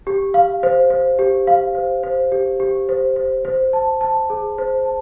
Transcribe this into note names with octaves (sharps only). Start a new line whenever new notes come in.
G4
F5
C5
C5
G4
F5
C5
C5
G4
G4
C5
C5
C5
A5
A5
G#4
C5
A5